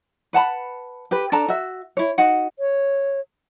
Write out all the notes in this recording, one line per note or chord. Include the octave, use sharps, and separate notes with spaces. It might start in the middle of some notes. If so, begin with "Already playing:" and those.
B4 F#5 A5 B5
G4 B4
D4 A4 A5 A#5
F#4 E5
E4 C#5
D#4 F#4 F#5
C#5